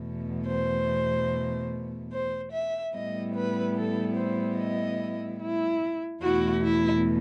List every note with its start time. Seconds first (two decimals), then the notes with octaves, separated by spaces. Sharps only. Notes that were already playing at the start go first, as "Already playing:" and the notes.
Already playing: E2 B2 A3
0.47 C5
2.12 C5
2.53 E5
2.93 A2 G3 B3 E4 D#5
3.35 B4
3.76 A4
4.16 C5
4.58 D#5
5.40 E4
6.22 E2 B2 A3 E4 F#4
6.64 E4